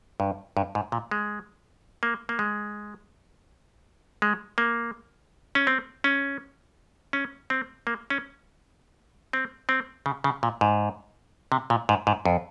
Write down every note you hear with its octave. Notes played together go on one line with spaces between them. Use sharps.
G2
G2
G#2
A#2
G#3
A#3
A#3
G#3
G#3
A#3
C#4
C4
C#4
C#4
C4
A#3
C#4
C4
C4
C#3
C#3
A#2
G#2
C3
A#2
G#2
G#2
F2